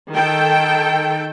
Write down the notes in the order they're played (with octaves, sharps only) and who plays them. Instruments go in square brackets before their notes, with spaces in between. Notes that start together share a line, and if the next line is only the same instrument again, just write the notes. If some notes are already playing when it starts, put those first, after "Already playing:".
[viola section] D#3 A4 G5